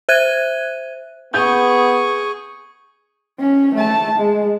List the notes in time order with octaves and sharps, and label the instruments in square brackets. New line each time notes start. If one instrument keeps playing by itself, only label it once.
[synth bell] C5 E5 F#6 G#6 D#7
[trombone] B3 [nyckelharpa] G#4 C#6 [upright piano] G6
[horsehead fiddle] C#4
A3 A5
G#3